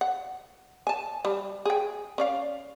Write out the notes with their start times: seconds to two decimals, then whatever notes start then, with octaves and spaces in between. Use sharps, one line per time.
0.01 F#5
0.87 G#5 A5
1.25 G3
1.65 G#4 G5
2.18 C#4 D5 F5